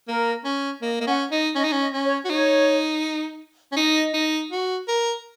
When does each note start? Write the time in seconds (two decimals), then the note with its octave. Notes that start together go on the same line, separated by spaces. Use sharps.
0.08 A#3 A#4
0.45 C#4
0.82 A#3 D#5
1.00 A#3 D#5
1.07 C#4 F#5
1.31 D#4 D#5
1.56 C#4 D#5
1.64 D#4
1.72 C#4
1.80 D#5
1.93 C#4
2.05 C#5
2.25 F#4
2.30 D#4 C#5
3.72 C#4
3.77 D#4 D#5
4.14 D#4
4.51 F#4
4.88 A#4